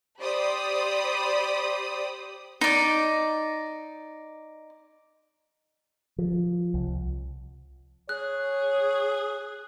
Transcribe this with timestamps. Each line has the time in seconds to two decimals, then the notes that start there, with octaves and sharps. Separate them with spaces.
0.20 G4 C5 D5 B5 D#6
2.61 D#4 D5
6.18 F3
6.74 C2
8.09 G#4 C#5 F#6